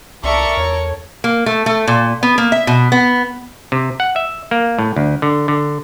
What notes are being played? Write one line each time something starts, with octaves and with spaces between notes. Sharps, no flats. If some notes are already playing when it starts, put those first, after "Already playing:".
C2 A4 A#4 D5 E5 C#6
E2 C#5
A#3
A3
A3
A#2
B3
A#3
E5
B2
B3
C3
F#5
E5
A#3
A2
D2
D3
D3